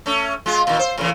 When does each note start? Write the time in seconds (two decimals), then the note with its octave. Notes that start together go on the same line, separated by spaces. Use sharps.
0.06 A3 C#4
0.46 G#3 F4
0.67 A#2 D#3
0.79 C5
0.98 A2 C#3 E3